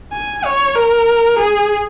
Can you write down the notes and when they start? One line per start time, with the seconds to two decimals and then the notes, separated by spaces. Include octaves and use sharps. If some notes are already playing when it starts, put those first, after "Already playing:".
0.13 G#5
0.45 C#5
0.76 A#4
1.39 G#4